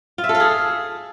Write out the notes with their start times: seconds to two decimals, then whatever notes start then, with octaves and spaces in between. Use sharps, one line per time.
0.18 F4
0.24 E5
0.29 A4
0.35 F5
0.40 G#4